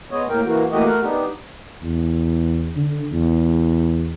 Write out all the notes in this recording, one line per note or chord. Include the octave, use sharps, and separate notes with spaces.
G#3 B3 C#5 D#5
A2 A#3 A#4 G5
E3 A#3 F#4
E3 A3 A#3 F#4 G4 D#5
A3 A#4 F#5
B3 D4 D#4 G4
E2
D3
E2